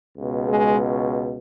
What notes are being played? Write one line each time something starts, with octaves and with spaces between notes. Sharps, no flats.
C#2 B2
G#3